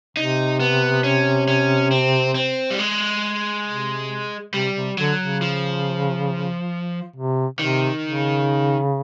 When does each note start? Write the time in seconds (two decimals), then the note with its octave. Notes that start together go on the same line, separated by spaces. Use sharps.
0.17 C3 D#4
0.60 B3
1.04 C#4
1.48 C#4
1.91 C4
2.35 C4
2.71 G3
2.79 G#3
3.67 C3
4.54 C3 G3
4.75 C3
4.98 D3 F#3
5.20 C#3
5.42 F3
7.16 C3
7.59 C3 D#3
8.04 C#3